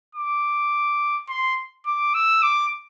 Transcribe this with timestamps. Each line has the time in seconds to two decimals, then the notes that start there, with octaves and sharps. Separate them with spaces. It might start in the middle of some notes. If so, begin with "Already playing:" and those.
0.15 D6
1.29 C6
1.86 D6
2.14 E6
2.43 D6